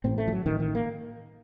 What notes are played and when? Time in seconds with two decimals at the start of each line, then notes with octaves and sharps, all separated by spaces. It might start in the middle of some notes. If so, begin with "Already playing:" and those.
0.04 A1 A2 C4
0.18 A3
0.28 F3
0.32 F#3
0.46 A1 A2 D#3
0.60 D#3
0.75 A#3